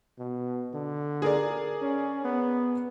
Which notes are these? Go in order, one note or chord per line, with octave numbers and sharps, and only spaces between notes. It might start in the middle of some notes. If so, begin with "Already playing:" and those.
B2
D3
G#4 A#4 D5
C#4
B3